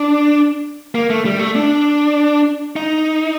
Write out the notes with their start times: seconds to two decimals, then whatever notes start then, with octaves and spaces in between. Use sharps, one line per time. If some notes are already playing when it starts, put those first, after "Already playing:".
Already playing: D4
0.95 A#3
1.10 A3
1.25 G3
1.39 A3
1.56 D4
2.76 D#4